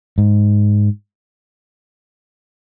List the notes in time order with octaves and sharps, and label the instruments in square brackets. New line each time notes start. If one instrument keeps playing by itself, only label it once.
[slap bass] G#2